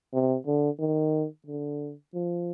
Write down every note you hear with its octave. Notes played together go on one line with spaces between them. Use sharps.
C3
D3
D#3
D3
F3